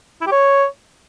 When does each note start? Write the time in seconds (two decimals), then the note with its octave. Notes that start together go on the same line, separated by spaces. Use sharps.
0.21 E4
0.27 G4
0.32 C#5